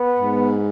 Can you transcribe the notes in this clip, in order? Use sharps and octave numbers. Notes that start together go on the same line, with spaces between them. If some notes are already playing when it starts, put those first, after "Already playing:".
Already playing: B3
G#2